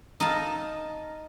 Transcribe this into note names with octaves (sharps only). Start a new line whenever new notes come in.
D#4 D#5 F5 A5